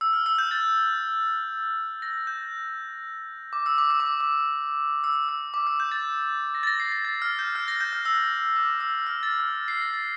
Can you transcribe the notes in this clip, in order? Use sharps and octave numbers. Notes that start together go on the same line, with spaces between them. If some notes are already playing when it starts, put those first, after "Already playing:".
E6
F6
E6
G6
A6
A#6
G6
D6
E6
D6
E6
D6
D6
E6
E6
D6
E6
G6
A6
A#6
A6
A#6
C7
A#6
A6
F6
G6
F6
A#6
G6
F6
E6
D6
E6
F6
A6
F6
C7
A#6
A6